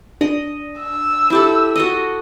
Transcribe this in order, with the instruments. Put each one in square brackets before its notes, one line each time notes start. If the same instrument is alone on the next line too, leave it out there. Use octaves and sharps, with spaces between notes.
[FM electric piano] D4 [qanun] D#5
[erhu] E6
[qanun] E4 G4 A4
F#4 A4 D#5